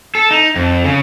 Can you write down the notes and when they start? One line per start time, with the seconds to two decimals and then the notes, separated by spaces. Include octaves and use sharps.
0.15 A4
0.31 D#4
0.56 F2
0.84 C#3